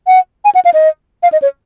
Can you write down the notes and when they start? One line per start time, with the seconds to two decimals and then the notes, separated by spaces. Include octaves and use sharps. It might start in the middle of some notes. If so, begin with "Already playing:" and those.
0.07 F#5
0.45 G#5
0.55 F#5
0.65 F5
0.74 D#5
1.23 F5
1.32 D#5
1.42 C#5